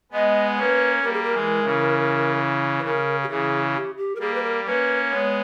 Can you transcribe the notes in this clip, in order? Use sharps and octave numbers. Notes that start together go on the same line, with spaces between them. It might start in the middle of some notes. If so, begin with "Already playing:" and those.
G#3 B3 D#5
A#3 C#4 B4
G3 A#3 A#4
G#4
A#4
E3 G#3
C#3 E3
B4
C#3 A#4
G4
C#3 E3 G#4
G4
G4
A#4
G3 A#3 G#4
B4
A#4
A#3 C#4 B4
G#3 B3 C#5